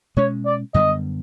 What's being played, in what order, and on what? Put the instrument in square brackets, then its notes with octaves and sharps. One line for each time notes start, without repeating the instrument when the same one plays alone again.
[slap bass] B2 G#3 C#4 [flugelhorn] C#5
[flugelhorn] D5
[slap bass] F#2 D3 G3 B3 [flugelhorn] D#5